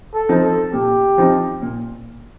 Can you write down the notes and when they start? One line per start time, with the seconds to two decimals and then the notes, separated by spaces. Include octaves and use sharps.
0.14 A4
0.29 F3 C4 D#4
0.44 A4
0.73 A#2 G4
1.18 F3 C4 D#4
1.62 A#2